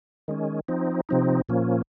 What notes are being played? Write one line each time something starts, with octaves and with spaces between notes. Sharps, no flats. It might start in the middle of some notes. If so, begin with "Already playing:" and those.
D#3 G#3 C#4
F3 C4 D#4
C3 F3 C4 D#4
A#2 F3 A#3 C#4